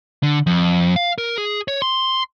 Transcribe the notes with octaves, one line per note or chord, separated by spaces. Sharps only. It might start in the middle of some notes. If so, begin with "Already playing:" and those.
D3
F2
F5
A#4
G#4
C#5
C6